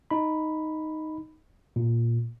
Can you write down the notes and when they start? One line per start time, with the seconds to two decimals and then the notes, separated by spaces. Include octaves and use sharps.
0.11 D#4 B5
1.76 A#2